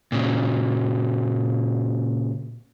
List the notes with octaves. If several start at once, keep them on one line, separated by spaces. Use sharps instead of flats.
A#2 C#3